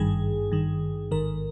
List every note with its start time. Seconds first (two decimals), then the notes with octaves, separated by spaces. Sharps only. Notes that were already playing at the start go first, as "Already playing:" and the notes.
Already playing: G#1 G2 D#3 G#4
0.51 G#1 G2 D#3
1.11 A1 G#2 D#3 A#4